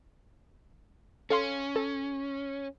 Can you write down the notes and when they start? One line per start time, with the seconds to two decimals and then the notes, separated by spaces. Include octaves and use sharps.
1.30 C#4 A4 F5 C6
1.76 A4